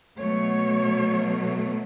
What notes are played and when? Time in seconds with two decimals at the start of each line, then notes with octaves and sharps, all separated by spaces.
0.19 B2 F#3 A3 C#5